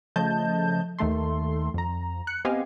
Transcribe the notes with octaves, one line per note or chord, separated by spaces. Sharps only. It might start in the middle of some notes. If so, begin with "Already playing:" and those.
C#3 F3 A3 D#5 A5 G6
D#2 D#3 A3 A4 C6
F2 A#5
F#6 C#7
B3 C4 G4 D#5 F5 G#5